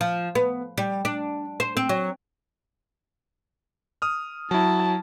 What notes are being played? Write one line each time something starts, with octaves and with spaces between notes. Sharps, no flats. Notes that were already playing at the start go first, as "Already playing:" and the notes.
F3
B3
G3
D4
C5
C4
F#3
D#6 F6
F#3 E4 A5